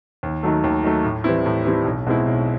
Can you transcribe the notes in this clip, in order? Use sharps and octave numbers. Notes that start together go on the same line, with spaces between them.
D#2
D#3 F#3 A3
D#2
D#3 F#3 A3
A2
E3 G3 C4 E4
A2
E3 G3 C4 E4
B1
B2 G#3 C4 E4
B1